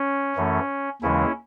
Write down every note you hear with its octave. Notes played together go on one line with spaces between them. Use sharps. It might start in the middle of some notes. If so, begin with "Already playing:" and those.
Already playing: C#4
F#2 E3 A3
D#2 C#3 E3 G#3 C#4 E4